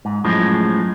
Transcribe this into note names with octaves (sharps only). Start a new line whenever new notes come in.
G#2
F#2 A2 F3 G#3